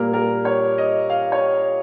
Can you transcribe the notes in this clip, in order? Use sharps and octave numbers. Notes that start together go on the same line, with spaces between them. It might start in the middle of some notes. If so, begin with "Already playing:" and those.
Already playing: A#2 G3 A#3 A#4
A#4
C#5
D#5
F5
C#5